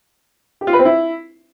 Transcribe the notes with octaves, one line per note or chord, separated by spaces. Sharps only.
G4
F4
B4
C4
E4